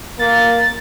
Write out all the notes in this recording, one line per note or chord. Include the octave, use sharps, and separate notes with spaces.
A#3 A6